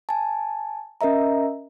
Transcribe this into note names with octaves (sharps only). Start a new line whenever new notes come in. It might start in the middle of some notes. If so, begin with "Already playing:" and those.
G#5 A5
C#4 A#4 D#5 E5 A#5